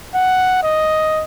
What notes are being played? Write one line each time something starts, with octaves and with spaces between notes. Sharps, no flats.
F#5
D#5